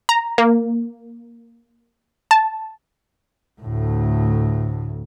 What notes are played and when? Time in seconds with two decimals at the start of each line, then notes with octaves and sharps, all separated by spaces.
0.09 A#5
0.38 A#3
2.31 A5
3.61 D2 A2